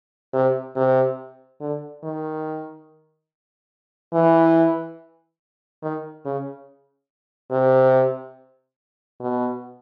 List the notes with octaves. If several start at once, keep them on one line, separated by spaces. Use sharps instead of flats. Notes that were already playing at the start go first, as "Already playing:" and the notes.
C3
C3
D3
D#3
E3
D#3
C#3
C3
B2